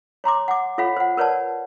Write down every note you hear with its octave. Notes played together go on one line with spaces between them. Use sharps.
C#5 A#5 C6 D6
F#5 D6
F4 A4 C#5 F5 F#5 B5
C5 F#5
A#4 B4 C#5 D5 F#5 A5